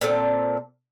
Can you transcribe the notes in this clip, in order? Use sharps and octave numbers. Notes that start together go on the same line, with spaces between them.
A#2 C4 A4 A5